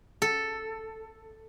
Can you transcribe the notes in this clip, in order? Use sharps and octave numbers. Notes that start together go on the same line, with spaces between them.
A4